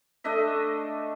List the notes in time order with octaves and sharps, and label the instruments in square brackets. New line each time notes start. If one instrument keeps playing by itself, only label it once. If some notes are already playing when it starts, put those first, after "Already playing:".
[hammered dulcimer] A3 D4 D#5 E5